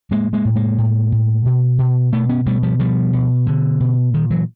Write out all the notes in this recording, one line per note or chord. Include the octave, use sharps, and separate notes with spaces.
A2 G#3 A#3
G#3 A#3
A2
G#3 A#3
A2
A2
B2
B2
B2 A3 B3
B3 C#4
B2 G3 A3
F3 G3
B2 F3 G3
B2
B2 D3
B2
A#2 D#3
E3 F#3